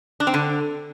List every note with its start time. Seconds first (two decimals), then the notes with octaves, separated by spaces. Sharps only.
0.20 D4
0.27 C4
0.34 D3